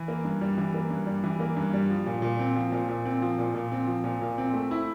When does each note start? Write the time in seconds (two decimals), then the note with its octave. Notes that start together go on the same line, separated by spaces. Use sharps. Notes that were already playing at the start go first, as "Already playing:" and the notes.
Already playing: E3
0.08 A#3
0.25 G2
0.41 G3
0.58 E3
0.74 A#3
0.90 G2
1.06 G3
1.24 E3
1.40 A#3
1.57 G2
1.73 G3
1.90 F3
2.06 A#2
2.22 A#2
2.39 C4
2.56 F3
2.72 A#2
2.89 A#2
3.05 C4
3.22 F3
3.38 A#2
3.55 A#2
3.72 C4
3.87 F3
4.04 A#2
4.21 A#2
4.38 C4
4.54 A3
4.71 E4